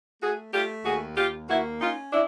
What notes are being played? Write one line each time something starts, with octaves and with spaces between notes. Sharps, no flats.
A3 F#4 G#4
A3 F4 G4
D#2 F#4 G#4
D#2 F4 G4
A#3 E4 F#4
C#4 D#4 F4
D4 E4